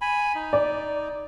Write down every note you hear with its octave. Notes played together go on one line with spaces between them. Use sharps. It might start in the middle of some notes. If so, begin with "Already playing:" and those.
G#5 B5
D#4
D5